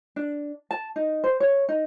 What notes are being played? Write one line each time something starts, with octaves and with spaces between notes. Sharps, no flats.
D4
A5
D#4
C5
C#5
D#4